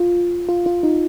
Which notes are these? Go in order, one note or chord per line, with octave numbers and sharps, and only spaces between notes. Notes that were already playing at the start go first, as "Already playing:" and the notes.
Already playing: F4
F4
F4
D#4